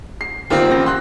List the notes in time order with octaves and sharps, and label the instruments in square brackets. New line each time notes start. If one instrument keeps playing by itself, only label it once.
[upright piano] C7
[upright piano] C2 D#3 A#3 [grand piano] C4 F4
[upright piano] A1 A#6
C6 F#6